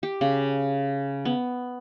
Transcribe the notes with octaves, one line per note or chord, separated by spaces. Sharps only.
G4
C#3
B3